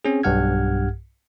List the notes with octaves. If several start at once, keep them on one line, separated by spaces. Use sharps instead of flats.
C4 C#4 G#4
B1 G2 G4 F#5 F6 G#6